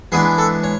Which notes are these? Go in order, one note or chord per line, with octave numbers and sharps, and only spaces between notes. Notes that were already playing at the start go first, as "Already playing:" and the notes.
E3 G#3 B3 D4 G#4
A4
C#5